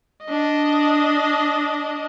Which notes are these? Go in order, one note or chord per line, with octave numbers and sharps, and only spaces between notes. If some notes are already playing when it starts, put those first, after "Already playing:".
D4 D#5